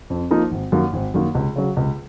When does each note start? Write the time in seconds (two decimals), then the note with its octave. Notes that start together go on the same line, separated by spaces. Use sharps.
0.10 F2
0.31 F3 A#3 D#4 A#4
0.51 G#1
0.72 F#2 D#3 A#3
0.93 G#1
1.14 F#2 D#3 A#3
1.35 C#2
1.56 C#3 F#3
1.77 C#2